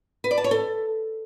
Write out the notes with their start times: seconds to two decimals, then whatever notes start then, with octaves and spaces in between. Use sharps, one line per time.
0.24 B4
0.31 D5
0.38 A5
0.44 C#5
0.51 A4